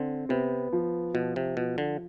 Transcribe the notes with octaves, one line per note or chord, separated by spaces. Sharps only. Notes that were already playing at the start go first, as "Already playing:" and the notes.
Already playing: D3 C4
C3 B3
F3
B2 F3
C3
B2 F3
D3